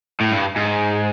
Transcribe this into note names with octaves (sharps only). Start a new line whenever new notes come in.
A2
G2
G#2